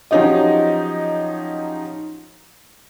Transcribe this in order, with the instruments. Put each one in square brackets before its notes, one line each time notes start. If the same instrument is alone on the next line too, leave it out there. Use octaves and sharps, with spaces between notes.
[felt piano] F3 F#3 C#4 D#4 G4 D#5